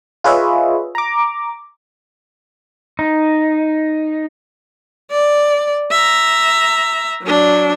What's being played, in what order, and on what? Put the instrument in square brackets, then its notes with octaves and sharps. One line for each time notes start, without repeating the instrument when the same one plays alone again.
[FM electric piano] F4 G#4 B4 C#5 D#5 E5
A#5 D6
[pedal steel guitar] D#4
[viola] D5
E5 A#5
F#3 D4